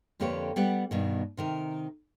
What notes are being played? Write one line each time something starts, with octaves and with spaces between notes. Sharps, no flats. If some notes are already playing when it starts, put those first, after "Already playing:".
F2 D3 A#3 G4 B4 C#5
G3 B3 G4 F#5
G2 B2 D#3
C3 D#3 A#4